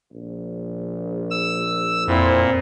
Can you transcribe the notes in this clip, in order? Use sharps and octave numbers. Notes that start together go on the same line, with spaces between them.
A#1
E6
F2 A#2 C4 E4